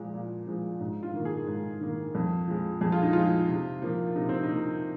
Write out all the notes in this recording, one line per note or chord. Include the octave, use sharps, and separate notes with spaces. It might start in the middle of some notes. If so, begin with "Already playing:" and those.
Already playing: A#2 F3 G#3
A#2
F3 G#3
G#2
F4
D#3 A#3
G#4
G#2
D#3 A#3
F2
F3 G#3
F2 G#4
F4
D#4
F3 G#3 F4
C3
F3 A#3
C3 D#4
C4
D#4
F3 A#3